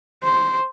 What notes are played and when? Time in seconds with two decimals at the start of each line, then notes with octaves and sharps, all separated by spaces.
0.24 C5